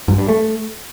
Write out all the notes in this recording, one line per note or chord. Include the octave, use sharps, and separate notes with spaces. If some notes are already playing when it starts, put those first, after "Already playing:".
G2
G2
A3